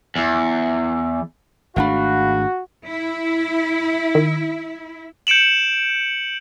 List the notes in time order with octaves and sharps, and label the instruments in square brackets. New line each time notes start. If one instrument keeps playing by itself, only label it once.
[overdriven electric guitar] E2
[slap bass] G#1 A3 D4 [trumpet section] F#4 [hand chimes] F5 F#5 B5
[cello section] E4
[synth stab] D#3
[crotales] G6 C#7 D7 E7 F#7